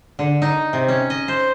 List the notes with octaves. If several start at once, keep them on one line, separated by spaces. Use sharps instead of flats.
D3
D#4
C3
C#4
D#5
C5